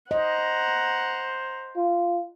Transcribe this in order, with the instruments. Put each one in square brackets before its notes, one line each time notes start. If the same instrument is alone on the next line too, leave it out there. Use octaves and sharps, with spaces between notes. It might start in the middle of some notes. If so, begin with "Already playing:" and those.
[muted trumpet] C5 [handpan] D#5 [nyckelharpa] F#5 A#5
[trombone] F4